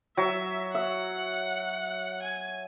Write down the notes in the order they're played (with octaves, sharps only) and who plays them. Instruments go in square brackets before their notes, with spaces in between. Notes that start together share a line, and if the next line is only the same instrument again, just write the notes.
[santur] F#3 [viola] E5
[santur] E5 [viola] F#5
[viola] G#5